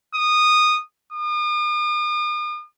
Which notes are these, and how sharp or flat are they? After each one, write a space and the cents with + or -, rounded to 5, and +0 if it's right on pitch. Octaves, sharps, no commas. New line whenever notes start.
D#6 -15
D#6 -45